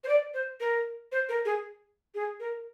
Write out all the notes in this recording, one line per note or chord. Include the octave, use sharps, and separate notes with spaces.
C5
D5
C5
A#4
C5
A#4
G#4
G#4
A#4